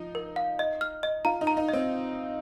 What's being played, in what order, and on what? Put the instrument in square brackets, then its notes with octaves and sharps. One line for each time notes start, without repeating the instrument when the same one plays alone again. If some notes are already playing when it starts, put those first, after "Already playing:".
Already playing: [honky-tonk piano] F3 D#4
[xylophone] A#4
F5
D#5
F6
D#5
[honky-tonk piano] F4 [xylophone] A#5
[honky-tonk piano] D#4
[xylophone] A#5
[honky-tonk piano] D#4
[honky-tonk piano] C4 [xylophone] D#5